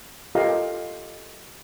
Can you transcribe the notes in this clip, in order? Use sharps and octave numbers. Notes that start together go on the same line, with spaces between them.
F4 G4 A4 A#4 D#5 F5